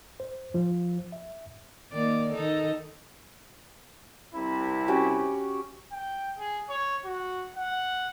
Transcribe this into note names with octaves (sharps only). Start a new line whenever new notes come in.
C5
F3
E5
D#3 A#3 D5
D#3 D#4 A4
C2 C3 E4
C#4 F#4 G4
G5
G#4
C#5
F#4
F#5